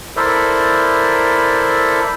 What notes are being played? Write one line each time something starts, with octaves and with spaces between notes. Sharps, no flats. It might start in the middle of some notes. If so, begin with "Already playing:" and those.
E4 A4 A#4 C5 D5 E5